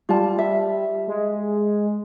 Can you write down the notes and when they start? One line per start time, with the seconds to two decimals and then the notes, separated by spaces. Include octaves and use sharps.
0.09 G3 F4 A5
0.38 E5
1.07 G#3